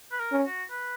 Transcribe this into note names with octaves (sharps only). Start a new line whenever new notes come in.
B4
A#4
C#4
F#4
B4